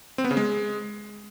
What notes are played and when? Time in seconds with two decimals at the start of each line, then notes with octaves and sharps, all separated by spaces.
0.18 C4
0.25 B3
0.31 C#3
0.37 G#3